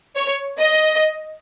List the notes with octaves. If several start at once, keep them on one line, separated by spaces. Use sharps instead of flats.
C#5
D#5